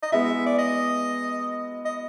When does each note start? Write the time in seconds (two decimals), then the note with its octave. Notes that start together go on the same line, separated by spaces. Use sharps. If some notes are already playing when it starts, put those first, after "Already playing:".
0.03 D#5
0.12 G#3 B3 E4 E5
0.46 D5
0.59 D#5
1.85 D#5